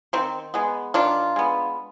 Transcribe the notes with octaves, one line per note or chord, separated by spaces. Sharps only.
D#3 C4
G#3 B3
D#3 D4 F4
G#3 B3